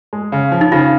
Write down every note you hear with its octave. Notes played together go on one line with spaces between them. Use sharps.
G#3
C#3
F3
D#4
C#3 F4